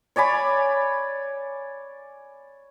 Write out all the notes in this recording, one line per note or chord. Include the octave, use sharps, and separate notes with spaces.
C#5 D5 G#5 B5